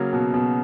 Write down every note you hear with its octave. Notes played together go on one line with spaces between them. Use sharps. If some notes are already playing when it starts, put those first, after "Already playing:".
Already playing: C#3 F#3 A#3
B2
B2